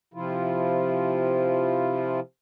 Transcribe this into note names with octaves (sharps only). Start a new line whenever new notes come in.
C3 F3 E4 F4